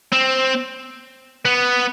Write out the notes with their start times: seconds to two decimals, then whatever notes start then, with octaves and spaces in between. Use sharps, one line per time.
0.13 C4
1.45 B3